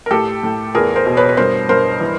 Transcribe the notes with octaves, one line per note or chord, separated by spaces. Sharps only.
A#4
A2 G4 A4
A2
E2 G#4 A#4
A#4 C5
B2
B4 C#5
B4
G2 A#4 C5
G2 A#4 C5
E3